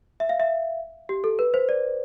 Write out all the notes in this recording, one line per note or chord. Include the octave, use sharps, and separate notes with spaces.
E5
F5
E5
G4
A4
B4
C5
D5